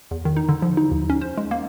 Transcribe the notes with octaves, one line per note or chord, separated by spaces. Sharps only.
E2
D#3
D#4
D3
F3
D#4
D#2
C#4
C5
G#3
A#3